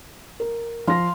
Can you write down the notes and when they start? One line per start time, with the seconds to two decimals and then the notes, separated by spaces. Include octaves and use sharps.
0.40 A#4
0.87 F3 F5 C6 A#6